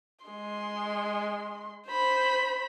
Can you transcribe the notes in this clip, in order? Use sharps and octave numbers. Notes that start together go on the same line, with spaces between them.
G#3 C6
C5 B5